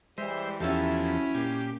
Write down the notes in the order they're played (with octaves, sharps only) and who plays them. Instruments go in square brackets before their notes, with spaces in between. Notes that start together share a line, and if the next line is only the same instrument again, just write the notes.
[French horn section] E3 G3 [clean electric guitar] G#3 [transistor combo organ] C5 E5
[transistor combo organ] E2 F3 [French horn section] F#3 E4 [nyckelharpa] C#4 [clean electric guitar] G4 A4 E5
[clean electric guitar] A#2 A#3 [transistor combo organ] G4